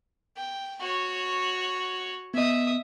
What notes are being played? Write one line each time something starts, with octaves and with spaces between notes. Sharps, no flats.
G5
F#4 C#5
B3 D#5 E5 D#6